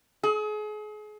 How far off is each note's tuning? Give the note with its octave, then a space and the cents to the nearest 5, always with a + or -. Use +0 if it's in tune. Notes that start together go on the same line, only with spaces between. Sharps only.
G#4 +35